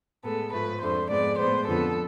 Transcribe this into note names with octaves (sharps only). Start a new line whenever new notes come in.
A2 G#3 B3 A4
G#2 F3 A3 B4
F2 D3 A3 C5
G#2 F3 G#3 B3 D5
A2 G#3 B3 C5
F2 D3 F3 B3 A4